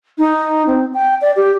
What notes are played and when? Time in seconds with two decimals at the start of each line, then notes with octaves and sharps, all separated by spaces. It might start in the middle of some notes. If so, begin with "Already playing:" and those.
0.18 D#4
0.67 C4
0.94 G5
1.21 D5
1.36 G4